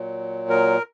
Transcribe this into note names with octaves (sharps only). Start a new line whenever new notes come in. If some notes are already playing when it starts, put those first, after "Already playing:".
Already playing: A#2 F#3
A#4